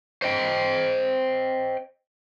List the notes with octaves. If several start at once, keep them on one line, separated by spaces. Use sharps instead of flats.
C5 D#5 G5